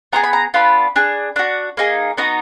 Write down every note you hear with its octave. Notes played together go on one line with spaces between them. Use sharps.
B3 F4 G#4 A#5
B5
A#5
B3 D4 F4 B5
D4 G#4
D4 F#4
A#3 D#4 G#4
B3 D#4 F#4 A#5